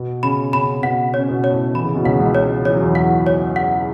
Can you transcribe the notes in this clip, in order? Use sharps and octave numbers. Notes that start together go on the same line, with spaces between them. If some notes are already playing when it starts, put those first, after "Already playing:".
Already playing: B2 B3
C#3 C#4 B5
C#3 C#4 B5
B2 B3 F#5
C#4 C#5
B2 B3
C#5
A2 A3
E3 B5
C#3
B2
C#2 C#3 F#5
C#2 C#3
C#5
E3 C#5
F#3
E2 E3
F#5
C#5
F#5